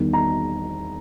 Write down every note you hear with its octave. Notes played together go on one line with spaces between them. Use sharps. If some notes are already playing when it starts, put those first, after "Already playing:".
Already playing: E2 D#3 G3
A#5